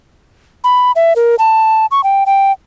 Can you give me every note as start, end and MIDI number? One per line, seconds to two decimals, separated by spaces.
0.64 0.92 83
0.96 1.13 76
1.16 1.35 70
1.39 1.86 81
1.91 2.04 85
2.04 2.24 79
2.26 2.52 79